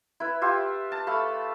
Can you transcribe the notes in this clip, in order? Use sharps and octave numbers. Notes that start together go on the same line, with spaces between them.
E4 B4
F4 G4 E5
A5
A3 F5 B5